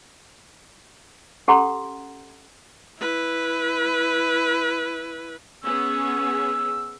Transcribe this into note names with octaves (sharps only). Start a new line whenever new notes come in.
C#4 G4 A4 F#5 A#5 C6
E4 B4
B3 C#4 G#4 E6